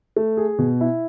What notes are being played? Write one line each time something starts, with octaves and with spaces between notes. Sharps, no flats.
A3
G#4
B2
E4